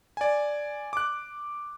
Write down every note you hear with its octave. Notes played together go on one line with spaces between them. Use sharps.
D5 G#5
D6 F#6